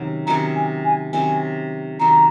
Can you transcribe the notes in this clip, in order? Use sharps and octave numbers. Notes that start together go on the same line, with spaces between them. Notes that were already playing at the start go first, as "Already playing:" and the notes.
Already playing: C3 D#3 F#3 C#4
C3 D#3 F#3 C#4 A#5
G#5
G#5
C3 D#3 F#3 C#4 G#5
C3 D#3 F#3 C#4 A#5